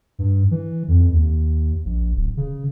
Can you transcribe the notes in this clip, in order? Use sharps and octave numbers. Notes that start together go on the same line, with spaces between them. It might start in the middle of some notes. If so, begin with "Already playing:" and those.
G2
E3
F2
D#2
A#1
D1
C#3